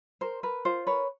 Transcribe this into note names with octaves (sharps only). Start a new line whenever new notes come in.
A#4 C5
A#4 B4
F4 C5
A#4 B4 C#5